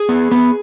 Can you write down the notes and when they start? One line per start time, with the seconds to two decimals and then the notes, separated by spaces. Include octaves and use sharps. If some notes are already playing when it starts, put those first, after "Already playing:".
Already playing: G#4
0.09 B3
0.32 B3